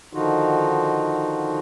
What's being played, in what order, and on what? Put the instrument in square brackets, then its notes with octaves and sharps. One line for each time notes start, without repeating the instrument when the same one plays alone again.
[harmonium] D3 D#3 F3 D#4 F4 F#4